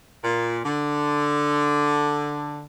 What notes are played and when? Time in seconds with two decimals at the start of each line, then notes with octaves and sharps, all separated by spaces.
0.24 A#2
0.65 D3